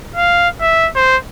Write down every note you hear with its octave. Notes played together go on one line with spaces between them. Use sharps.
F5
E5
C5